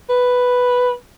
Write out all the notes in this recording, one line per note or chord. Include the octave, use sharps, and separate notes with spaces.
B4